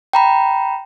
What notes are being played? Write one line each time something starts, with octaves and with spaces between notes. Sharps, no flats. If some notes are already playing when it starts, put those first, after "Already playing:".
G5 A#5 B5